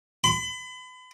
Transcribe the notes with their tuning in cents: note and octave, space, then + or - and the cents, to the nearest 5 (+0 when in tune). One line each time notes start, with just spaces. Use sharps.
B5 +40